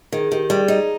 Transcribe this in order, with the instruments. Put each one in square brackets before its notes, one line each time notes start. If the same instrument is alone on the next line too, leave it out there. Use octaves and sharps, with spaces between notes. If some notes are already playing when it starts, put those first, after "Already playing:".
[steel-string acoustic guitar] D#3 [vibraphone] G#4
[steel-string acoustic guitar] D#3 [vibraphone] G4
[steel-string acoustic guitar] G3 [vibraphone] G#4
[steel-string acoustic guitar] D#4